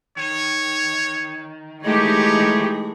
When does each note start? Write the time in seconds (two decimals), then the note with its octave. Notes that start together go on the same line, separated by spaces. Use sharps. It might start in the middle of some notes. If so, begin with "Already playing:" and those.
0.17 D#3 C#5
1.83 E3 G#3 A3 D#4 G4 C#5